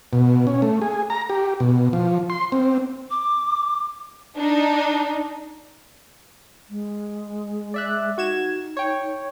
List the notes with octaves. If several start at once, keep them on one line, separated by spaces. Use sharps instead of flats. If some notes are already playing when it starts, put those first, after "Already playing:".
B2
C#4
A3
G#4
A#5
G4
B2
F3
C6
C4
D6
D4 D#4
G#3
D5 E5 F#6
D#4 F#4 G#6 E7
C#5 G5